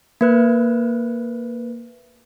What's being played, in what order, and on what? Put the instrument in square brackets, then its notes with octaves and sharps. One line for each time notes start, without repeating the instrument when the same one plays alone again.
[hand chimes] A#3 B4 F#6